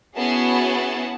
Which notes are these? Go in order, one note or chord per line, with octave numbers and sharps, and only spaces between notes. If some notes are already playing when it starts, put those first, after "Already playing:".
B3 C#4 E4 F#4 G#4 A5